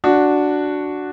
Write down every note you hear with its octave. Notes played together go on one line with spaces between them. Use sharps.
D4 F#4